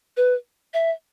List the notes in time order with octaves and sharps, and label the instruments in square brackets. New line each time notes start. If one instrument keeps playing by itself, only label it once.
[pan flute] B4
E5